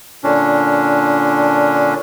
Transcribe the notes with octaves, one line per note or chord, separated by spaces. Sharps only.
A#2 D3 C#4 D4